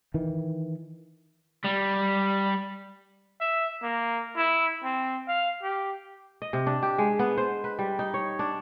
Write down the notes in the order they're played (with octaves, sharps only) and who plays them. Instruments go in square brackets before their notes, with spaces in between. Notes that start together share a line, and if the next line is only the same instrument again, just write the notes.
[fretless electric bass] D#3 E3
[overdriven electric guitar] G3
[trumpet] E5
A#3
E4
C4
F5
G4
[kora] D#5
C3
D4
G4
G#3
B3
C5
B4
G3
D#4
C#5
D4